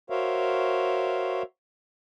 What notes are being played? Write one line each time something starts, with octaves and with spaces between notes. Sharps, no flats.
F#4 A#4 C5 C#5 E5 F5